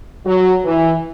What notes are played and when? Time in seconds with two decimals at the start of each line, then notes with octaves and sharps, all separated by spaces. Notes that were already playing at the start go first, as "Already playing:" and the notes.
0.26 F#3
0.65 E3